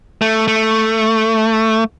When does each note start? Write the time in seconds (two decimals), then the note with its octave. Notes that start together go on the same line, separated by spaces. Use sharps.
0.22 A3
0.48 A3